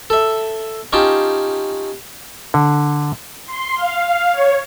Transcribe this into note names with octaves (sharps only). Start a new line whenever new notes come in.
A4 E5
C#4 D#4 F4 G4 G5 A5
D3
C6
F5
C#5